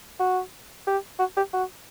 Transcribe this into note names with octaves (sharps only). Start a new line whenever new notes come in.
F#4
G4
F#4
G4
F#4